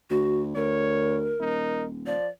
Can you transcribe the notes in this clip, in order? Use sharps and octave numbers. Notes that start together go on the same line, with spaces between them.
D2 F#4
D2 A#4 C#5
D#1 D#4
F3 D5